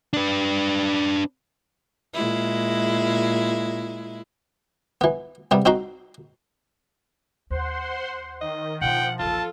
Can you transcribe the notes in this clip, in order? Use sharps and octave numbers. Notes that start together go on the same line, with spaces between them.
D4 B4
A#2 G#3 E4
E3 B3
C3 G3 B3
C4 D#4 F#4 A#5 C6
D#2 C5 F#5 C6
D#3 D#5
B2 F3 D4 F#5 G5
A#1 E2 F4 A4 A5